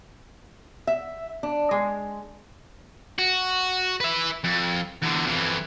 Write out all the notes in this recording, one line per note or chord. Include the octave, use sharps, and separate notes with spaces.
E5
D4
G#3
F#4
B4 E5
F2
E2 D3
F2 E3